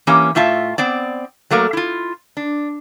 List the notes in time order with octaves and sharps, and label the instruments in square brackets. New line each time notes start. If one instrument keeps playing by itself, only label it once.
[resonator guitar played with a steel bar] E3 A#3 C#4 G4 G#5
A2 A3 F4 E5 A5
B3 C4 D5
F#3 A3 A#3 A#4
E4 F4
D4